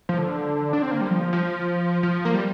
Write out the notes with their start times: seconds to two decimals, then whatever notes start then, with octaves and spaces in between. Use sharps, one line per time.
0.09 F3
0.18 D3
0.73 D4
0.82 C4
0.91 A#3
1.01 G3
1.10 F3
1.33 F3
2.03 F3
2.25 A#3
2.34 G3